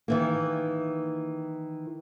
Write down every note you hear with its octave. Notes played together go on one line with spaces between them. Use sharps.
D#3 E3 A#3